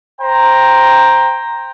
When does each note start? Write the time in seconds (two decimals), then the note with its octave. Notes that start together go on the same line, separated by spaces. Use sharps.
0.21 C5 G5 A#5